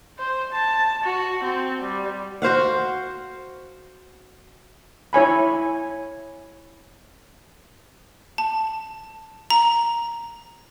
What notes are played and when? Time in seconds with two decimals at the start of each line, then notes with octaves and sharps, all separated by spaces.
0.19 C5
0.53 A5
1.04 F#4
1.44 C4
1.82 G3
2.42 F#4 C5 F5 F#5
5.13 E4 C#5 G#5 B5
8.38 A5
9.50 A#5